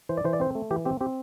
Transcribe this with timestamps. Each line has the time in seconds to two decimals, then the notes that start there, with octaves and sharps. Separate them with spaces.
0.09 E3 C5
0.17 D5
0.24 E3 C5
0.33 D5
0.40 C4 C5
0.55 A3
0.70 E3 G4
0.85 C4 G4
1.01 C4 G4